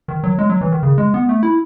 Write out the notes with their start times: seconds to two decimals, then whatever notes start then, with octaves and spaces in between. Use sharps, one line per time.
0.08 D#3
0.24 F#3
0.39 G#3
0.50 F#3
0.61 E3
0.72 D#3
0.83 C#3
0.98 G#3
1.14 B3
1.29 A3
1.43 E4